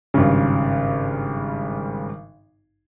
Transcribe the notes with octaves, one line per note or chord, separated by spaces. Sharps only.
G#1 G2 C#3